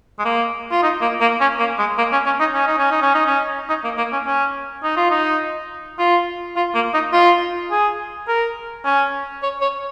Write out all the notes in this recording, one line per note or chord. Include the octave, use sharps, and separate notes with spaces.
G#3
A#3
F4
D#4
A#3
A#3
C#4
A#3
G#3
A#3
C#4
C#4
D#4
C#4
D#4
C#4
D#4
C#4
D#4
C#4
D#4
A#3
A#3
C#4
C#4
D#4
F4
D#4
F4
F4
A#3
D#4
F4
G#4
A#4
C#4
C#5
C#5